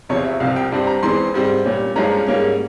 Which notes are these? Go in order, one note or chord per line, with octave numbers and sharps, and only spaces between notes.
E2 C3 F3 C#5
E5
C2 C3 F3 F5
G5
G2 G3 C4
A#5
E2 E3 G#3 C4 C6
G#2 G3 C4
A#2 G3 C#4
G2 F3 G#3 C#4 A#5
G#2 G3 A#3 C#4